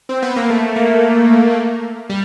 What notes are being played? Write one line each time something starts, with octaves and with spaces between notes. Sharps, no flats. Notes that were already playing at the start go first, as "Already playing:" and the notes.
C4
B3
A#3
A3
A#3
G3